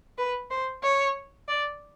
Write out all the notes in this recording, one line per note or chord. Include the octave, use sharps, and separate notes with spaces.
B4
C5
C#5
D5